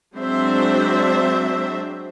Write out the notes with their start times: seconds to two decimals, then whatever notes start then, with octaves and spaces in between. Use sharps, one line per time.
0.14 F#3 G#3 C4 D4 C5 E5